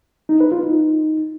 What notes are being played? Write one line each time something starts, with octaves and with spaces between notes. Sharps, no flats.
D#4
B4
F4
D#4